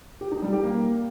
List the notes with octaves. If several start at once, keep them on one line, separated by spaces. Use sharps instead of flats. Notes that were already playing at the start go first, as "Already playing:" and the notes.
G4
D#4
G3
G4
A#3